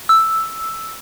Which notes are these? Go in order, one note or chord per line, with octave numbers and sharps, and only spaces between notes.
E6